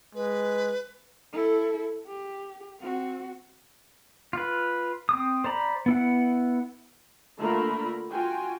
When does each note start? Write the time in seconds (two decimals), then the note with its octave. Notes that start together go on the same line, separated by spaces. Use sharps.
0.15 G#3 B4
1.33 E4 A4
2.07 G4
2.80 C4 F#4
4.33 F4 B4
5.09 C4 D#6
5.44 C5 D5 A#5 B5
5.86 B3 E4 F#5
7.38 D3 A3 A#3 F4 A#4 B5
8.12 F4 F#4 G5 G#5